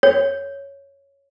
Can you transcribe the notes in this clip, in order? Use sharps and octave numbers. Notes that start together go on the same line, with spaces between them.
C#5